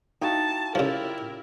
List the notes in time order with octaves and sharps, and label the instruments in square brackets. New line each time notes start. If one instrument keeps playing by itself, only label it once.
[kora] D#4 E4 F#4 [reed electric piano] F5 G5 [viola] A5
[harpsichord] C#3 F3 [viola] E4 A#4 [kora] F4 G4 D5